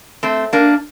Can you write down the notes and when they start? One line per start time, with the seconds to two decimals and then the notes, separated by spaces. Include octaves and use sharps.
0.23 A3 C4
0.53 A#3 D4